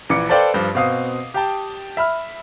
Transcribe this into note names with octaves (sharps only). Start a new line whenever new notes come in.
A#1 E3 D6 C#7
A4 B4 C5 D5 F5 G5
G2 F3
B2 C4 F5 D#6 C7
G4 G5 A5
E5 B5 F6